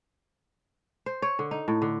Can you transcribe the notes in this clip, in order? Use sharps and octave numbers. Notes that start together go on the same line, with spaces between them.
C5
C#5
D3
D#4
A2
D3